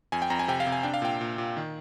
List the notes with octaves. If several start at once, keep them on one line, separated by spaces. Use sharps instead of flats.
F2 G#5
G5
F2 A#5
G#5
C3 G5
F5
C3
G#5
D4 G5
F5
A#2 G5
A#2
A#2
D#3